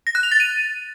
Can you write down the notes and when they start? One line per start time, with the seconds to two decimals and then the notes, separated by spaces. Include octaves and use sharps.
0.07 A#6
0.15 F#6
0.23 F7
0.32 A6
0.40 D#7